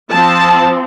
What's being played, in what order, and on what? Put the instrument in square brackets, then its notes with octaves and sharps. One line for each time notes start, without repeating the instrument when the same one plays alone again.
[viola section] F3 C4 A5